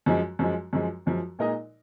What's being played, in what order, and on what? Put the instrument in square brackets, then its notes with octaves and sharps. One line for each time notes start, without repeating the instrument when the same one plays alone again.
[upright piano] F#2 F3 G#3
F#2 F3 G#3
F#2 F3 G#3
F#2 F3 G#3
A#2 G#3 D#4 A#4 D#5